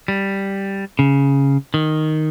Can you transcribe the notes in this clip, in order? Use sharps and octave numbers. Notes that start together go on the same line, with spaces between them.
G3
C#3
D#3